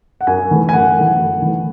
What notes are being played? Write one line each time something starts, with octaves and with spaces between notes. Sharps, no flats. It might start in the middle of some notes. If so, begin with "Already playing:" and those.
F#5
F#2 G#5
E3 A3
G#5
F#2 F#5
E3 A3
F#2
E3 A3